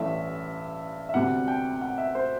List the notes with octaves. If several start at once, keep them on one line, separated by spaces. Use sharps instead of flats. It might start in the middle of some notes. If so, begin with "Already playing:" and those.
Already playing: A1 G2 E3 A3 E5
E5
D2 C3 G3 B3 F#5
G5
F#5
E5
C5